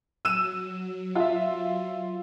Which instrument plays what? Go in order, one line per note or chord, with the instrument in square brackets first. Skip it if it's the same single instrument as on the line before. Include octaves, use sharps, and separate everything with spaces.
[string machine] F#3 [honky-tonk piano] E6 D#7 E7
[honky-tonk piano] F4 E5